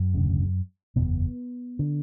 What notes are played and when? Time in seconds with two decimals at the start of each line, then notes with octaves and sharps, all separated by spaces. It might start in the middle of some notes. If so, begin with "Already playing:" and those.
Already playing: F#2
0.14 E1 D2 C#3
0.96 F#1 E2 B2 B3
1.79 D3